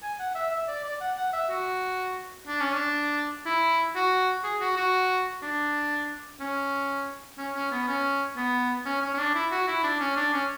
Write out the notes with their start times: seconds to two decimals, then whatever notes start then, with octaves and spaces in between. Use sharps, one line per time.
0.03 G#5
0.20 F#5
0.35 E5
0.51 E5
0.68 D5
0.84 D5
1.01 F#5
1.17 F#5
1.33 E5
1.50 F#4
2.48 D4
2.61 C#4
2.73 D4
3.46 E4
3.95 F#4
4.44 G#4
4.60 F#4
4.77 F#4
5.43 D4
6.40 C#4
7.38 C#4
7.55 C#4
7.72 B3
7.88 C#4
8.37 B3
8.86 C#4
9.02 C#4
9.14 C#4
9.19 D4
9.35 E4
9.52 F#4
9.68 E4
9.84 D4
10.00 C#4
10.17 D4
10.33 C#4